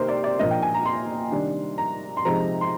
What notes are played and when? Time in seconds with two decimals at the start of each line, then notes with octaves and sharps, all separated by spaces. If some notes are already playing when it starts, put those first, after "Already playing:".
Already playing: C3 D#3 A#3 A#4 C5
0.08 D5
0.24 D5
0.39 A#2 F3 A#3 D4 D#5
0.51 G5
0.62 G#5
0.74 A#5
0.85 C6
1.32 C3 D#3 G3 D4
1.78 A#5
2.17 C6
2.25 C3 F3 G#3 D#4 A#5
2.61 C6